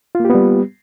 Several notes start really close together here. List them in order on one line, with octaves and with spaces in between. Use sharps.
F4 A#3 G4 B3 G3